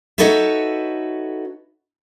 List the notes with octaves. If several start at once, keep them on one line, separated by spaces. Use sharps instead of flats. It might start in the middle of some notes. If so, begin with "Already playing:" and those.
D#4 F#4 A4 B4 C#5 E5